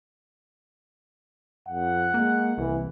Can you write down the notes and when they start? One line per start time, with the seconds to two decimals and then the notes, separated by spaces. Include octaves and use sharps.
1.69 F2 F#5
2.14 G#3 A#3
2.58 C2 E3